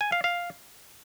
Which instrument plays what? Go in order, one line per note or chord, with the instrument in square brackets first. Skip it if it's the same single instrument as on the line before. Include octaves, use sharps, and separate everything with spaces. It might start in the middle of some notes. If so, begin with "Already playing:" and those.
[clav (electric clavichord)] G#5
F5
F5